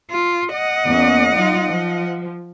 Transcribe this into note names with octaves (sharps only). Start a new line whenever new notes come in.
F4
D#5 F#5
E2 A#3 C#4
F#3 D#4 F4
F3